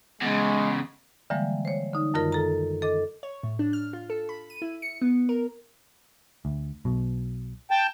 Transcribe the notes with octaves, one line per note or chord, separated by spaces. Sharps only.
E2 C#3 G#3
D3 E3 F3 G3 G#3 A#3
C5 C#5
D3 D#4
F#2 D#3 F4 A#4
F4 A4 A#5
A4 D#5 D6
C#5
A2
D4
F6
F4
A4
B5
D#7
E4
C#7
B3
A#4
D2
B1 B2
G5 A5